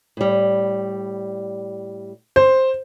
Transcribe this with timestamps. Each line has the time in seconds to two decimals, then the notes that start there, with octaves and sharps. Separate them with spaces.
0.17 A2 G3
2.36 C5